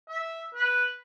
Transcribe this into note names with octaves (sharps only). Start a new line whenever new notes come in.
E5
B4